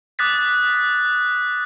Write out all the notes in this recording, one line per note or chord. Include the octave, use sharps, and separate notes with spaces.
D6 D#6 F#6 A6 B6